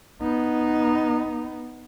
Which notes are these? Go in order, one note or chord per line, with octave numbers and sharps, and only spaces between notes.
B3 D#4